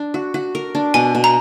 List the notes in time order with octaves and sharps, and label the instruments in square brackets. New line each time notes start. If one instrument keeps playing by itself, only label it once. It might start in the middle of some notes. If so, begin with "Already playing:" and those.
Already playing: [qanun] D4
F#4
F#4
A#4
D4
[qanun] B2 [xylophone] G#5
[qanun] B2
[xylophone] A#5